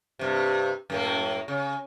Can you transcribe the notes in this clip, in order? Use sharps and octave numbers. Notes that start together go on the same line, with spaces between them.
G2 C3
F#2 A2 A#3
C#3